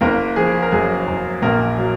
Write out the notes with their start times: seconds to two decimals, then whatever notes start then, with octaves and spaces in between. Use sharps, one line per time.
0.01 F#1 A#3 A#4
0.36 F3 G#4
0.62 A#4
0.72 F#2 G#4
1.07 F#1
1.42 A#1 A#3 A#4
1.78 F#3